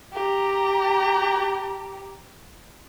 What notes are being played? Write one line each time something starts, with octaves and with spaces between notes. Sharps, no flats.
G4 A#5